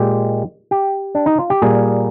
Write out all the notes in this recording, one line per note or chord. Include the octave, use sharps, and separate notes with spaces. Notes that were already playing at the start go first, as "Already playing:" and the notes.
Already playing: A#2 G#3 G4
G4
D4
D#4
F4
G4
A#2 G3 A#3 G#4